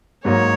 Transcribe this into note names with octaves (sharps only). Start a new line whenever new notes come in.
G#2 F#3 A#3 D#4 C#5